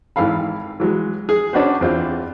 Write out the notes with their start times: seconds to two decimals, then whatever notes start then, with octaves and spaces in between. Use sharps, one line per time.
0.16 G#1 E3 A4 F5 B5
0.80 E3 F#3 G#3
1.29 G#4
1.53 C#4 D4 F#4 B4 C5
1.81 E2 C4 F4